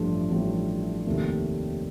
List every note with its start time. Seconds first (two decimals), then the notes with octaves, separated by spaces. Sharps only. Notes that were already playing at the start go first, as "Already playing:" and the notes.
Already playing: A1 G2 F3 A3
0.30 A1 G2 F3 A3
1.06 F1 D#2 D#3 A3